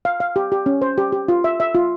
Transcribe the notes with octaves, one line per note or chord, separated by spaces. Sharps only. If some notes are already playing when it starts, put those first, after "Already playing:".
F5
F5
G4
G4
C#4
C5
G4
G4
F4
E5
E5
F4